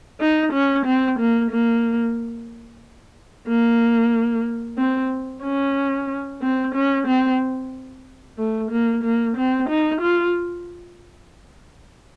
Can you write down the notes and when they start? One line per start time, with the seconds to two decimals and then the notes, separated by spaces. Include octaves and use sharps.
0.20 D#4
0.53 C#4
0.86 C4
1.19 A#3
1.51 A#3
3.47 A#3
4.78 C4
5.43 C#4
6.42 C4
6.74 C#4
7.07 C4
8.38 A3
8.71 A#3
9.04 A#3
9.37 C4
9.69 D#4
10.01 F4